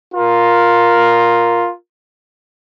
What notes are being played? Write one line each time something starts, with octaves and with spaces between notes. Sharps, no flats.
F4 A#4